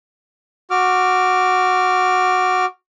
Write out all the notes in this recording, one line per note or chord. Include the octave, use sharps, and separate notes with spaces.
F#4 D6 F6